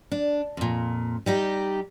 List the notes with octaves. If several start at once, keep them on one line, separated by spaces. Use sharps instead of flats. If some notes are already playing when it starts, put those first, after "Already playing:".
D4
F2 A#2
G3 D#4 G4